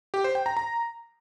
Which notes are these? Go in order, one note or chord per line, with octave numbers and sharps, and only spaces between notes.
G4
C5
G5
A#5
A#5